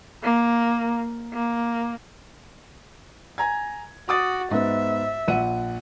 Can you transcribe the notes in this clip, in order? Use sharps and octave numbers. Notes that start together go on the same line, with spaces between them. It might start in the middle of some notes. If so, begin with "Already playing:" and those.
A#3
A#3
G#5 A#5 G#6
F#4 D6 D#6 A6
G#2 B3 E5
A#1 F#5 D#7